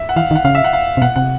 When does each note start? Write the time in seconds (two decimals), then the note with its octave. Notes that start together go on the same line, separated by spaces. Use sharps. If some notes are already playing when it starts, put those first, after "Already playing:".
Already playing: E5
0.09 F#5
0.16 E3 F5
0.31 D#3
0.35 F#5
0.45 C#3 F5
0.55 E5
0.64 F#5
0.73 F5
0.97 C3
1.02 B2 F#5
1.16 C3 F#5